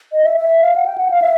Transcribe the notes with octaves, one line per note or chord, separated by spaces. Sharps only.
D#5
E5
E5
F5
F#5
G5
F#5
F5
E5